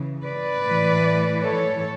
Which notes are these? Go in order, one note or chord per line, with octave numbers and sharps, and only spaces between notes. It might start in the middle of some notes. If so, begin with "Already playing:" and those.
Already playing: C#3 E3
B4 D5
A2 E3
A4 C#5